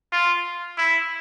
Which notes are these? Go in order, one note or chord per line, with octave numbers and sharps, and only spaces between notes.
F4
E4